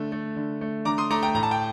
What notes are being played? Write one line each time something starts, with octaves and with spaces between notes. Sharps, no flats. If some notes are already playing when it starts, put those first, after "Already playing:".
Already playing: D3 A3
A3
D3
A3
D3 A#5 D6
C6 D#6
A3 A#5 D6
G5 A#5
A2 A#5
A5
G5